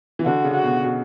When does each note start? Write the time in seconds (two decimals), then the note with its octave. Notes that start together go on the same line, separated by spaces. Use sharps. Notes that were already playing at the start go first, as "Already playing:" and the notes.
0.19 E3
0.25 D3 F#4
0.44 C#3
0.55 F#4
0.64 B2
0.84 B2